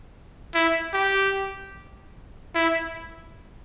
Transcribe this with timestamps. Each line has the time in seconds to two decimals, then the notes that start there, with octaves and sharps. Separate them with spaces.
0.54 E4
0.94 G4
2.55 E4